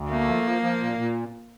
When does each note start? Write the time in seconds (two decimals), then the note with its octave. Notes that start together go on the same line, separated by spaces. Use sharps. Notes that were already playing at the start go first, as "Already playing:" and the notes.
Already playing: D2
0.10 A3 A#3
0.28 F3
0.45 F3
0.62 F3
0.81 A#2
0.98 A#2